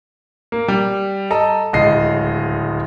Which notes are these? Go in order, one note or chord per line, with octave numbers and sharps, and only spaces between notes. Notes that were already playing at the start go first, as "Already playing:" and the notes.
A#3
G3
A4 D#5 A#5
D1 C#2 D#5 C7